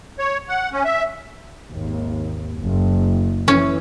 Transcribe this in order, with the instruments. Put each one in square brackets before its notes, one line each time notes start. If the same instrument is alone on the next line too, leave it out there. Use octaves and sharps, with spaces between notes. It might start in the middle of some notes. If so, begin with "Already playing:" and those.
[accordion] C#5
F#5
C#4
E5
[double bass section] G#1 D#2
F#1
[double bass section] E3 [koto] C#4